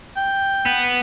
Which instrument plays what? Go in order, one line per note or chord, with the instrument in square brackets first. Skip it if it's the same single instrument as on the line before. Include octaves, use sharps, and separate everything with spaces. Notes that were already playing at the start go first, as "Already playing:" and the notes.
[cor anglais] G5
[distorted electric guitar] B3